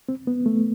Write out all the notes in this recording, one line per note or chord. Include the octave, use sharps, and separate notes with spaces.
C4
B3
A3